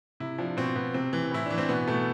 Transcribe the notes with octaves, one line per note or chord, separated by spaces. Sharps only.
C3 E4
F3 D4
B2 C4
B2 B3
C3 C4
E3
A2 E4
E3 D4
C4
B2 B3
B2 A3